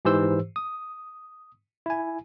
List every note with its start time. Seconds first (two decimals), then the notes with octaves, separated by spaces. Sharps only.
0.05 G#2 E3 G4 C5 E6
0.56 D#6
1.86 E4 G#5